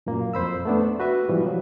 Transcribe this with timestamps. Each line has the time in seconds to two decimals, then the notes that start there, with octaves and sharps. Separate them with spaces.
0.06 F#2 A#2 A#3
0.34 F2 C5 B5 E6
0.65 A3 B3 D4
1.00 F#4 B4 E5
1.28 G#2 B2 E3 F3 G3
1.46 F#3